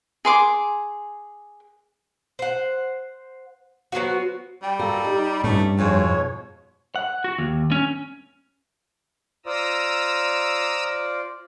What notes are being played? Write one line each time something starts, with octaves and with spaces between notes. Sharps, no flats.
G#4 C6 D6
C5 F#5
F#3 B3 C4 F#4
G3 G5
F4 F#4 A4 A#4
D#4 G4
G2 A3 C#4
F2 G#2 B2 F4 G#4 C#5
F#5
F#4
D#2
C#4
F4 C5 D5 A#5 D#6 E6